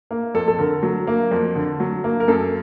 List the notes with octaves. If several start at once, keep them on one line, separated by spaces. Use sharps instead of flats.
A#3
F2 A4
A4
D3 A#4
F#3
A#3
F2
D3
F#3
A#3
A#4
F#2 A4